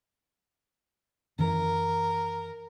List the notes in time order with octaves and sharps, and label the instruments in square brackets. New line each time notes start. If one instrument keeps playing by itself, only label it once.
[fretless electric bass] F#2 D#3 E3 [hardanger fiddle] A#4